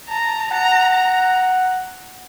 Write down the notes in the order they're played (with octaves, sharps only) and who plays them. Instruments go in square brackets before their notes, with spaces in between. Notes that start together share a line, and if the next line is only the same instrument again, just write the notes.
[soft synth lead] A5 [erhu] A#5
[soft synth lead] A5
A5
[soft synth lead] F#5 [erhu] A#5
[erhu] A#5